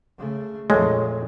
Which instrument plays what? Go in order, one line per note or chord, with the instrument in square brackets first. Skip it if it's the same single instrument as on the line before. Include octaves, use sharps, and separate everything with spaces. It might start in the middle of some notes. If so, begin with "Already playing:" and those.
[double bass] C#3 A3
[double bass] F2 A#2 [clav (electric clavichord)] G#3 [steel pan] A3 [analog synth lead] C#5